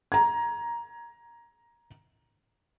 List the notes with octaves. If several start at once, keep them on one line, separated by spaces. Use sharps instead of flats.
A#5 G#6